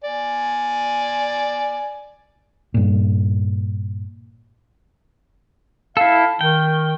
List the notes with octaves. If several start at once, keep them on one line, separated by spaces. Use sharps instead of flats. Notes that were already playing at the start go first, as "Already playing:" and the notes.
D5 G#5
G2 A#2
E4 A4 F5
D#3 G5